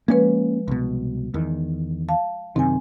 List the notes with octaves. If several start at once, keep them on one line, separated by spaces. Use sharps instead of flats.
F3 G#3 A#3 C#4 B4
C2 B2
E2 D#3
F5 A5
F#2 C3 D#3 C4 G#5